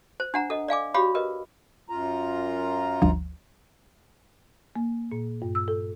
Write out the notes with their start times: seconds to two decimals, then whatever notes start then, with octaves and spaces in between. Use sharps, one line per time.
0.20 C5
0.34 D4 F#5 A#5
0.50 A4 D#5
0.68 D5 F5 G#5 D6
0.94 F#4 G4 C#5 F5 B5 D6
1.15 A#4 B4 D#5
1.90 F#2 F4 A#5
3.02 G1 D2 F3
4.76 A#3
5.12 A#2
5.42 G2
5.55 E6
5.68 A4